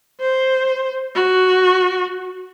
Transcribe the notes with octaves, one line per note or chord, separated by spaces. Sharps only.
C5
F#4